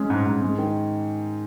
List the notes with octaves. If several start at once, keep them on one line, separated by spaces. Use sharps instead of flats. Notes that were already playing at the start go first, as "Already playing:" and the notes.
Already playing: G#3 C#4
G#2
G#2
G#3
D#3